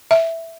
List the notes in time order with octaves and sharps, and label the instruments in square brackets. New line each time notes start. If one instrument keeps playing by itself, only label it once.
[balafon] E5